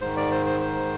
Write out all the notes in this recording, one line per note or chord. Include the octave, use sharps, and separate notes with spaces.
G#2 D#3 C5
D5
C5
C5
C5